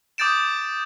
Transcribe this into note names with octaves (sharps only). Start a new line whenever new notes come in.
D6 D#6 G6 A6 D7 E7